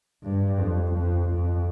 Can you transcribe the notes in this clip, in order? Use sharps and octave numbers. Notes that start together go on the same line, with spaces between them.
G2
F2
F2
F2